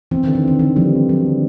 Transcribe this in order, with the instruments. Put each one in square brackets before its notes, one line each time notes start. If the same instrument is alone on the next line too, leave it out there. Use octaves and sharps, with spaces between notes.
[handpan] E3 [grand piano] C4
[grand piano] D3 [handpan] D#3
[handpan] E3
[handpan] D#3 [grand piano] C4
[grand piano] D3 [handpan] E3
[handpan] F3 [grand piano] G3
[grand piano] C4
[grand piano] D3 [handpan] F#3
[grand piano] D3